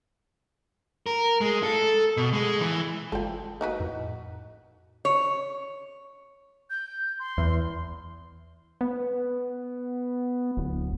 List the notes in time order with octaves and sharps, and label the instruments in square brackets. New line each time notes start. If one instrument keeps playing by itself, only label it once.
[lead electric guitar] A#4
G#3
A4
B2
G#3
E3
[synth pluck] G1 G#3 F4 [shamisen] A4 G5
[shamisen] D#4 F#4 B4
[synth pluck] F2 A2
[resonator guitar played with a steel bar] C#5
[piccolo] G6
C6
[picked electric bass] E2
[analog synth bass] B3
D1